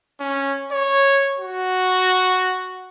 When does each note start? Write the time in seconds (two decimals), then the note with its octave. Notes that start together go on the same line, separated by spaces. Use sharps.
0.20 C#4
0.72 C#5
1.39 F#4